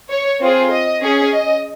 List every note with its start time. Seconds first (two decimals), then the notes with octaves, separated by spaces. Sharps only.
0.10 C#5
0.41 C4 F4 G#4
0.70 D#5
1.02 C#4 G#4
1.33 D#5